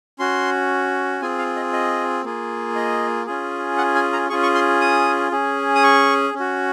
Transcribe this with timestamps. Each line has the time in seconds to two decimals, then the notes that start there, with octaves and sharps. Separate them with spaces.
0.19 C#4 F#4 C6
1.22 C4 F4 G#4 G#5
1.38 F5
1.56 D#5
1.73 D#5
2.24 A#3 F4 G#4
2.75 D#5
3.26 C#4 F4 G#4
3.78 F#5
3.95 G#5
4.13 A#5
4.29 C#4 F4 G#4 C#6
4.43 C#6
4.55 C6
4.81 D#6
5.32 C#4 G#4
5.75 D#6
5.83 C#6
6.34 C#4
6.40 F#4